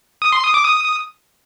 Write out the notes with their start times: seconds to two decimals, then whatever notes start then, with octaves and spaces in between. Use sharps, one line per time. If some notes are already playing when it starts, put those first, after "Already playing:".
0.22 D#6
0.32 C6
0.43 D#6
0.54 D6
0.65 D#6